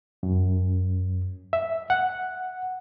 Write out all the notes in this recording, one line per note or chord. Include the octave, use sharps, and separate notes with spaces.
F#2
E5
F#5